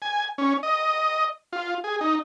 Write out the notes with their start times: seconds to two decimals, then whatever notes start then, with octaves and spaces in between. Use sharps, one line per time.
0.02 G#5
0.38 C#4
0.63 D#5
1.53 F4
1.84 G#4
2.01 D#4